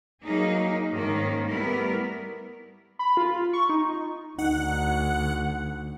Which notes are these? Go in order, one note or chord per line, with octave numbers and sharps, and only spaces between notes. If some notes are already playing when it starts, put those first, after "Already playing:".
F#3 A#3 D#4 G#4
G#2 D#3 A#3 C#4
G3 A3 B3 E4 A#4
B5
F4
C#6
D#4
D2 D#4 F#5